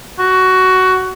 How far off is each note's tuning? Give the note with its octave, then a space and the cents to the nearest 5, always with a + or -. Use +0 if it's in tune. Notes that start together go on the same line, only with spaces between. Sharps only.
F#4 +15